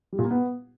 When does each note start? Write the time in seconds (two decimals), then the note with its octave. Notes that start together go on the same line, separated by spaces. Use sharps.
0.12 G3
0.19 A#2
0.25 A#3
0.31 B3